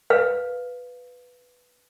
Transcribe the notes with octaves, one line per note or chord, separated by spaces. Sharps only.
B4 F5